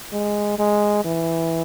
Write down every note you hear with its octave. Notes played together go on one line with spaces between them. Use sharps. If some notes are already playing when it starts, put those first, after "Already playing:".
G#3
G#3
E3